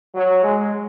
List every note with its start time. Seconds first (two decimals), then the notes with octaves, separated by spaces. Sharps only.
0.15 F#3
0.44 G#3